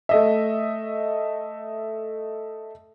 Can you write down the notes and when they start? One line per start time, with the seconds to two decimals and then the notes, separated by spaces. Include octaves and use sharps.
0.09 A3 D#5 E5